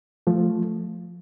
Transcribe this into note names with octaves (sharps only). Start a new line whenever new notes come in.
F3 A3